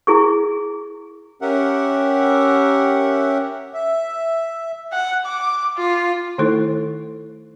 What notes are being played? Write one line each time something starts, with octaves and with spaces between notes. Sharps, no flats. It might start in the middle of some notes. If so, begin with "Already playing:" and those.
E4 G#4 C#6
C#4 G4 A#4 E5 F#5
E5
F#5
D6
F4
D#3 A3 D#4 E4 A4 C5